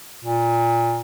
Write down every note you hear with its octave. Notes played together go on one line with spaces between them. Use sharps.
A#2